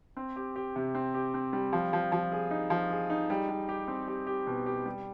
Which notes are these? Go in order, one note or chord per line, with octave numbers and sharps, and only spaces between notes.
C4
G4
G4
C3
C4
G4
C4
G3
F3
F3
F3
G#4
D#4
F3
G#4
D#4
G3
G3
G4
C4
G4
G4
B2
G4
G3